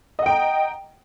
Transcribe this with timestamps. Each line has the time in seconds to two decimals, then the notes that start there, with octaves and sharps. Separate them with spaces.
0.19 D#5
0.22 F#5
0.26 G5
0.30 A#5